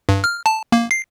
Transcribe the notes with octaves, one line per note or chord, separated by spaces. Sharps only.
G2
F6
A5
A#3
C7